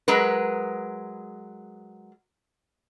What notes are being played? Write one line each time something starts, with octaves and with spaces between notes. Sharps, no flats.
F#3 G#3 A#4 B4